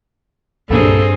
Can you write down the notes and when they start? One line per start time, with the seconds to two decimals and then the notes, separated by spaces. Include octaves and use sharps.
0.70 C2 G2 A#2 C4 G#4 A4